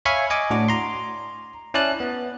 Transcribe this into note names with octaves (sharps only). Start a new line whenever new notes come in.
C#5 E5 F5 G#5 B5 C#6
D#5 G#5 D6
A2 D4 F#4 D6
A#5 C6
C#4 E4 D5 A5 F#6
B3